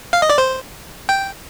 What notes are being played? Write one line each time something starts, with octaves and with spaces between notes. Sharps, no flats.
F5
D#5
D5
C5
G5